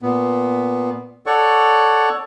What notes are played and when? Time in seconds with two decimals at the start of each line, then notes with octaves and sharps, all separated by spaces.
0.02 A#2 B3
1.26 A4 C#5 D5 F#5 C#6